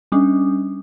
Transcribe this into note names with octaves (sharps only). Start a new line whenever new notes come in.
G3 C#4 D4